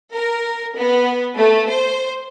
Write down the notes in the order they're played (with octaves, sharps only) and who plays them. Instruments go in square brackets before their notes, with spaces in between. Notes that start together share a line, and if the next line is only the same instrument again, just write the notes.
[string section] A#4
B3
A3
C5